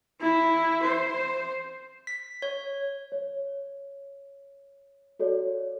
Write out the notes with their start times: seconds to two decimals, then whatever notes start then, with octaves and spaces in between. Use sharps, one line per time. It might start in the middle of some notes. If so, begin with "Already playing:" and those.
0.21 E4
0.83 C5
2.07 B6
2.42 C#5
3.12 C#5
5.19 F#4 A4 C#5 D5